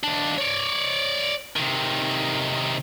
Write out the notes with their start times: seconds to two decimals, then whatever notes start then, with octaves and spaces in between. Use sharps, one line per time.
0.04 D#2 D4
0.38 C#5 D5
1.56 C3 D#3